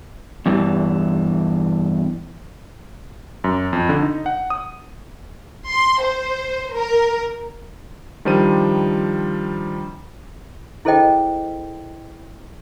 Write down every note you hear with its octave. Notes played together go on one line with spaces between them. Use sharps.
E2 G2 E3
F#2
F2
D3
D#4
F#5
D#6
C6
C5
A#4
D#3 F3 G3 D4 C5 D#7
E4 G#4 A4 C5 D#5 G5